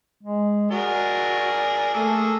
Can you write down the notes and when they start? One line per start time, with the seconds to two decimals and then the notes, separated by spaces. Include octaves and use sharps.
0.23 G#3
0.71 F#4 G#4 A#4 D5
1.94 A3 A#3 G#4 A4